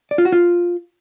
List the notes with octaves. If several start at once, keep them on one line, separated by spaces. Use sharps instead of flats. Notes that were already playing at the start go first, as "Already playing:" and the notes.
D5
F4
F#4
F4